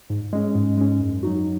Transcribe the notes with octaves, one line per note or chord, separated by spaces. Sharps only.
G#2
G#3 C#4
G#2
G#3 C#4
F#2
F#3 D#4 F#4